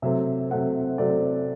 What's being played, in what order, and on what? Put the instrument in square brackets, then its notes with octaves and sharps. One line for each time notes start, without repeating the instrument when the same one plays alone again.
[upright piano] C3 F#3 A3 C4 E5
C3 F#3 A3 C4 F#5
C3 F#3 A3 C4 D5